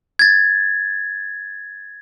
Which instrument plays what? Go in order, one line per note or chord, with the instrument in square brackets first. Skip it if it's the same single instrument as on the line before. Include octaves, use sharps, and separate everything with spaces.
[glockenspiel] G#6 A6